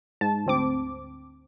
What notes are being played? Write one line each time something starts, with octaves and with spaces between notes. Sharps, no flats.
G#2 A5
D2 C4 D6